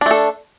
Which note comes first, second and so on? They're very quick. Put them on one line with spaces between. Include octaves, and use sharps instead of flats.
D4 A3 A4